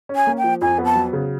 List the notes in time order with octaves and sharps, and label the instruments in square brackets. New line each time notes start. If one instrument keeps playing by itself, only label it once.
[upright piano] C#4
[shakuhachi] G#5
[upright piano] A#3
[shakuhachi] G5
[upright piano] F3
[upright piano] F2 [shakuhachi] G#5
[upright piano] B3
[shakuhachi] A5
[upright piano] F#3
C#3